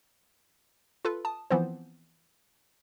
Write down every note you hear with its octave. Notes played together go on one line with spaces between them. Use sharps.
F4 A4 B4
A5 D#6
E3 F3 B3 C4 C5